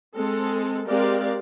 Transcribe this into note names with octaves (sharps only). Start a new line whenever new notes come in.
G#3 C4 A4
G#3 C4 G4 A#4 D5 F5